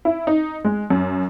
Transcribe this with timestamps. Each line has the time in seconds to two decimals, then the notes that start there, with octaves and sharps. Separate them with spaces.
0.05 E4
0.27 D#4
0.65 G#3
0.90 F#2